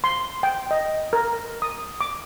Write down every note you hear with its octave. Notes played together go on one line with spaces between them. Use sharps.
C6
G5
D#5
A#4
D#6
D6